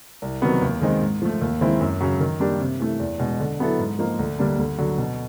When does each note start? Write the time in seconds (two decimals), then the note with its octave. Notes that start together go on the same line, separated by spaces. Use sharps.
0.22 C2
0.42 C3 D#3 F#3 B3
0.62 D#2
0.81 D#3 G#3 C4 D#4
1.01 G#2
1.22 F3 A3
1.41 D#2
1.61 D#3 G#3 C4 E4
1.81 F#2
2.01 C#3 F#3
2.20 D#3
2.40 G3 A#3 D4 G4
2.60 C3
2.80 E3 A3
2.99 E2
3.19 B2 G#3
3.40 D3
3.60 F#3 B3 E4 A4
3.79 G#2
3.99 F3 A#3 D#4
4.19 D2
4.39 D3 G3 A#3 D4
4.58 D2
4.78 D3 F#3
4.98 B2